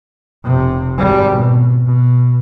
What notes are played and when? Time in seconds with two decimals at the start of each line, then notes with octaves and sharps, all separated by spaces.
0.44 F1 C3
0.98 G#1 G3
1.37 B2
1.86 B2